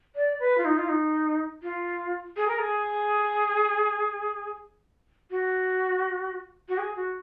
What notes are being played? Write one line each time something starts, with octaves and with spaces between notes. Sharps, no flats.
D5
B4
F4
D#4
F4
D#4
F4
G#4
A#4
G#4
F#4
F#4
G#4
F#4